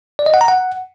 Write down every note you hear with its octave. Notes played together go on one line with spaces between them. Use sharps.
D5
D#5
F#5
A#5
F#5